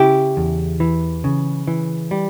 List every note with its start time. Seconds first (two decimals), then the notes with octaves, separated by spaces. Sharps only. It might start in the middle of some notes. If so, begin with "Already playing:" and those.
Already playing: C#3 E4 G4
0.37 E2
0.80 E3
1.24 C#3
1.67 E3
2.11 G3